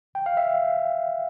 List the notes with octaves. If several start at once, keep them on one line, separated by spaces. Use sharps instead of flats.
G5
F5
E5